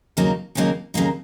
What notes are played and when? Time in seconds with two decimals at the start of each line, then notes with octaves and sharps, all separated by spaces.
0.17 D#2 C#3 F#3 A#3 D#4
0.55 D#2 C#3 F#3 A#3 D#4
0.94 D#2 C#3 F#3 A#3 D#4